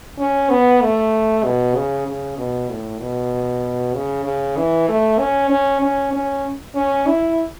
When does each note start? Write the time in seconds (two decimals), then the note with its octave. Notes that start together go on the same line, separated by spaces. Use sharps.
0.18 C#4
0.50 B3
0.82 A3
1.44 B2
1.76 C#3
2.07 C#3
2.37 B2
2.70 A2
3.00 B2
3.94 C#3
4.25 C#3
4.57 E3
4.88 A3
5.19 C#4
5.50 C#4
5.82 C#4
6.13 C#4
6.75 C#4
7.07 E4